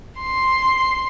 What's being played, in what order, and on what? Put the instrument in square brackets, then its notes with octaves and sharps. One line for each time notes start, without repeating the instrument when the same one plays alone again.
[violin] C6